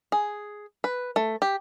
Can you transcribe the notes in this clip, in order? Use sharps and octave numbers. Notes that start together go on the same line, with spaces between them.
G#4
B4
A3
G4